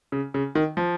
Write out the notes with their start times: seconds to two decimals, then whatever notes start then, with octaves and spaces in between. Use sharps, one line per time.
0.12 C#3
0.34 C#3
0.55 D#3
0.77 F3